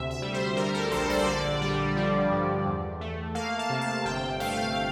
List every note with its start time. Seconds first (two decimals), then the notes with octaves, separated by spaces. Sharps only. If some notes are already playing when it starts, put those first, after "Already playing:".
Already playing: D2 C3 E5
0.11 E5
0.22 G3
0.34 C5
0.57 G3 A#4
0.74 A4
0.91 A#1 C5
1.10 D5
1.27 D3
1.61 G3
1.97 F3
2.32 G2
2.65 E2
3.01 A3
3.35 A#3 F5
3.59 A5
3.70 C3
3.81 A5
4.05 G1 G5
4.40 A3 F5